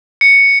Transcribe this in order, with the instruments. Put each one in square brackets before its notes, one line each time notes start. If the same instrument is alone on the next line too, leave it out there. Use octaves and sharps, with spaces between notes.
[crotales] C#7